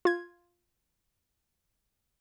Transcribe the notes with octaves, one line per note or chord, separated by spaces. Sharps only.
F4 G#6